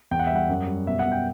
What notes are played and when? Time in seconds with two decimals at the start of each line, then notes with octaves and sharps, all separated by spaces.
0.11 E2 G5
0.19 F#5
0.27 E5
0.31 G3 F#5
0.49 F#2
0.67 G3
0.87 B2 E5
0.99 F#5
1.05 B2
1.12 G5